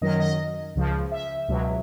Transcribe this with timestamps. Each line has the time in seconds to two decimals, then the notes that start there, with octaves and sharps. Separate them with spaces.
0.01 F#2 D#3 F#3 D#5
0.20 D#5
0.75 C#2 C#3 F3
1.12 E5
1.48 C#2 B2 F#3